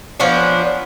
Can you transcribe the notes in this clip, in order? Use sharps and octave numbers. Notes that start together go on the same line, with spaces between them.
F3 B3 C#4 D4